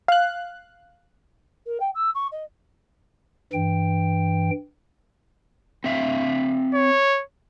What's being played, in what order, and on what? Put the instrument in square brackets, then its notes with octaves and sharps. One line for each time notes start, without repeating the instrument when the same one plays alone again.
[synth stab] F5 F#6
[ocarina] A#4
G5
E6
C#6
D#5
[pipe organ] G2 E3 G5
[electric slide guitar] C4 E5 F5
[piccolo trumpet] C#5